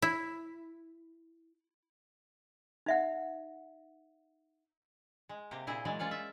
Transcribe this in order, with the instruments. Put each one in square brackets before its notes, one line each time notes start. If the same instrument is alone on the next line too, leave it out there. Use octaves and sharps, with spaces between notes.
[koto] E4
[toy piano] D#4 E5 F#5
[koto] G#3
C3 A#3 G4
A#2 E4 G#4 C5
E3 F#3 G#3 D5
C#4 F4 D5 F5
E5